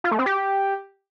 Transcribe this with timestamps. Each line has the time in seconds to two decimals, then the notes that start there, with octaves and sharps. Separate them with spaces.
0.04 F4
0.11 A3
0.19 C4
0.26 G4